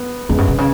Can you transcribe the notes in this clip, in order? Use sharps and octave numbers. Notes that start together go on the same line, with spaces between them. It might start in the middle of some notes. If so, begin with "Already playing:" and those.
Already playing: B3
E2 C#3 G#3 B3
F#2
B2
C#3